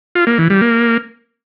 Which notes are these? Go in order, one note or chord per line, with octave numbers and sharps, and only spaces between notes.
F4
A#3
E3
G3
A#3